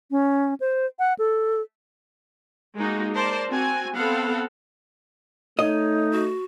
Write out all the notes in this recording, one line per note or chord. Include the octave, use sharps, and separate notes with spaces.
C#4
C5
F#5
A4
G#3 A#3 D#4 F#4
A#4 C5 D5 A5
C4 F#4 G#5
B3 C4 A4 F5 F#5
A3 D#4 C#5 D#5
F#4